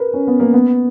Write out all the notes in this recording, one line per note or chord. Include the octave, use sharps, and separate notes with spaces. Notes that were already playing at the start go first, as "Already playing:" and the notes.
Already playing: A#4 B4
C#4
B3
A#3
B3